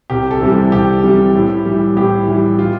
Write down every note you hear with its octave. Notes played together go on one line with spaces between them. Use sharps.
C2 G4
A4
C3 E3 G3
A4
C2 G4
C3 E3 G3
A2
E3 G3
A2 G4
E3 G3
F4